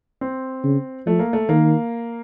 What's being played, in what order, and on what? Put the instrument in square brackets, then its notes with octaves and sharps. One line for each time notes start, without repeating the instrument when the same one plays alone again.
[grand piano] C4
[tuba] C#3
[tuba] F3 [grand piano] A3
[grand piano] A#3
A3
[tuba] D#3 [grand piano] A#3